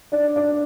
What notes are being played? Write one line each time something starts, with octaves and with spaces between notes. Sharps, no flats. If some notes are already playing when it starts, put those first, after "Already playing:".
D4 D5
D4 D5